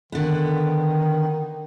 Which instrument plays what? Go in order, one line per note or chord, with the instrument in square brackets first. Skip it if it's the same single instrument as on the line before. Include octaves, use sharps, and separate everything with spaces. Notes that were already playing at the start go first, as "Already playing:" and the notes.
[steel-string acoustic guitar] D3 B3 [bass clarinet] D#3